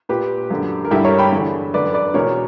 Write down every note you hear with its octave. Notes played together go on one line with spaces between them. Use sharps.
A#2 G4 B4
F#2 D3
A#4
G2 D3 E4 G4
A#4 C#5
G5 B5
E2 D3
F#2 D3 B4 D5
B4 D5
E2 B2 A#4 C#5